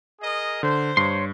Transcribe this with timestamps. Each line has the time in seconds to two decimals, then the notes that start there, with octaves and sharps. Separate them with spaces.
0.21 G#4 A#4 D#5
0.63 D3 C5
0.97 G2 C#5 C6